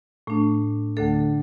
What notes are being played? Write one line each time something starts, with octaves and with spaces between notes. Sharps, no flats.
A2 A3 D4
D2 D3 A3 D4 A4